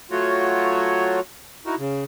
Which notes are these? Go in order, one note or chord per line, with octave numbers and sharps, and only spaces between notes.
F#3 A3 F4 F#4 C#5
D#4 E4 F#4 A#4
C#3